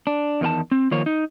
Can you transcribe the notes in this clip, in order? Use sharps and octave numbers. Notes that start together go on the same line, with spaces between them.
D4
E2 D#3 F4 A5
C4
D#3 F3 A#3 C#5
D#4